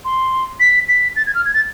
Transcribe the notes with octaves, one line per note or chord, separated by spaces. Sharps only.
C6
B6
B6
A6
G#6
F6
G#6
A6